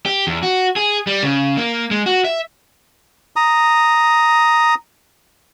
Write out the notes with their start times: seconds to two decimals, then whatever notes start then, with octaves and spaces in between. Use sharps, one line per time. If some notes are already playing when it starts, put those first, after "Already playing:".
0.06 G4
0.27 E2
0.43 F#4
0.76 G#4
1.07 G3
1.23 C#3
1.57 A#3
1.91 G#3
2.06 F#4
2.24 E5
3.36 A#5 D#6